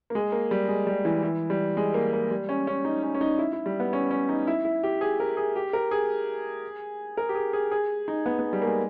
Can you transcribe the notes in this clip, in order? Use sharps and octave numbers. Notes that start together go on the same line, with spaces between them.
A#3
G#3
A#3
G3
G#3
G3
E3
E3
G3
G#3
A#3
A#3
G3
C#4
C#4
D#4
C#4
C#4
D#4
E4
E4
G3
B3
C#4
C#4
D#4
E4
E4
G4
G#4
A#4
G#4
G4
A#4
G#4
A#4
G4
G#4
G#4
G#4
D#4
B3
B3
G3
A#3
G#3